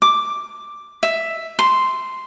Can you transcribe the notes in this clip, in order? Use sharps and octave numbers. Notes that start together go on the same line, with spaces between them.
D6
E5
C6